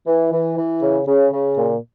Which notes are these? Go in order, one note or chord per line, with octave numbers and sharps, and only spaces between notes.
E3
E3
E3
C#3
C#3
C#3
A#2